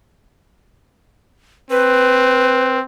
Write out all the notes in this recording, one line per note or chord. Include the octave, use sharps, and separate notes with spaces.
C4 B4